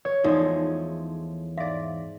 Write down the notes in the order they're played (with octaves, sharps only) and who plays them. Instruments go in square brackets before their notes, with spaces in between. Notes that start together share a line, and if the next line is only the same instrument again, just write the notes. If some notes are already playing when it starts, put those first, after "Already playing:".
[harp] C#5
[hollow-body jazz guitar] E2 [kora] F3 G#3 A3 [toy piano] D#4 A4 D5
[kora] G#2 D5 [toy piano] E5 F5